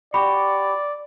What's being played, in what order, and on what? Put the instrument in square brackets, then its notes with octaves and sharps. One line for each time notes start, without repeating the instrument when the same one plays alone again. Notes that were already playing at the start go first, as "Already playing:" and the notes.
[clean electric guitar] F#4 G4 [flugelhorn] D5 [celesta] B5